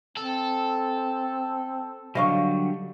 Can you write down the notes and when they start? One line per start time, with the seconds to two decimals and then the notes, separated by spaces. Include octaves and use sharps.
0.17 C4 A4
2.15 D3 F#3 G3 D#5 F5 C#6